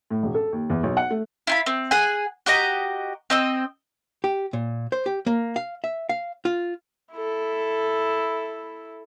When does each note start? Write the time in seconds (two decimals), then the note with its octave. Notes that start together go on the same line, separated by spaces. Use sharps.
0.10 A2
0.23 E1
0.35 A4
0.53 D#2
0.70 E2
0.83 B1
0.97 F#5
1.11 A3
1.47 E4 F4 B5
1.66 C4
1.91 G#4 F#5 G#5
2.46 F#4 G4 D#5 A#5
3.30 C4 D#5 E6
4.24 G4
4.53 A#2
4.92 C5
5.06 G4
5.26 A#3
5.56 F5
5.84 E5
6.09 F5
6.45 F4
7.12 E4 A4